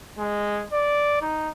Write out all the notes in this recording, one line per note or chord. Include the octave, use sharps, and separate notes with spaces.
G#3
D5
D#4